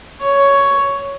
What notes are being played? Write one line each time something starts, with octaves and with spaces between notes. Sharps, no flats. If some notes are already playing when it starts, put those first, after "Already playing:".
C#5